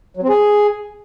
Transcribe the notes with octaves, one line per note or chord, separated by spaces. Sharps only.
F#3
C4
G#4